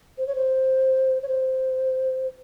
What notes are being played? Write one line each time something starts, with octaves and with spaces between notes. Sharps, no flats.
C5
C#5
C5
C#5
C5